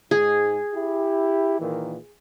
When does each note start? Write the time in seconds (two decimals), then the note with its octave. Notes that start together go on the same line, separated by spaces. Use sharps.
0.11 G#2 G#4
0.74 E4 G4
1.59 A#2 D#3 E3